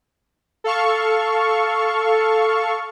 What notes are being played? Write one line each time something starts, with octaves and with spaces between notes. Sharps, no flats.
A4 F5 C#6